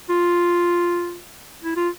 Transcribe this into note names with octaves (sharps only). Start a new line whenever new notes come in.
F4
E4
F4